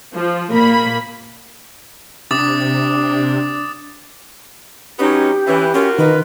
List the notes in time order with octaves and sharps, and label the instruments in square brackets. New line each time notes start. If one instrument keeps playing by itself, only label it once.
[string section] F3
A#2 A#3 B5
[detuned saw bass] C3 [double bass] D4 [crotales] D6 D#6 A6
[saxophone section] F#3 B3 D#4 [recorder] C#4 [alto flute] G4
[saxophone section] E3 [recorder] C#4
[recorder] C#4 [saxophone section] F4 F#4 A#4
[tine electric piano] D#3 D#4 [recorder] B4 [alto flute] D#5